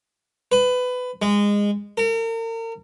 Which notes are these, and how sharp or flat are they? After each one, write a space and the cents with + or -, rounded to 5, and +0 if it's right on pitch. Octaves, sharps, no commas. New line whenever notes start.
B4 +20
G#3 -20
A#4 -40